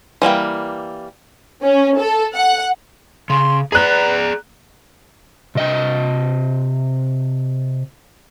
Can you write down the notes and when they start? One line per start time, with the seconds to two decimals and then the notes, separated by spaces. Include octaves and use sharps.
0.22 E3 G3 A#3 G5
1.63 C#4
1.98 A4
2.35 F#5
3.30 C#3 C6
3.72 G#4 B4 D5 A#5 F#6
5.55 C3 D#5 G5